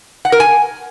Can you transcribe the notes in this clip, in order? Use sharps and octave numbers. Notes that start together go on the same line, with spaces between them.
F#5
A#4
G#5